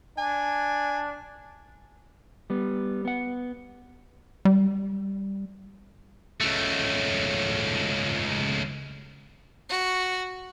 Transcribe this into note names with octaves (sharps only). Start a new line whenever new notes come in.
D4 G#5
G3 B3
B3 F#5
G3
C#2 A3
F#4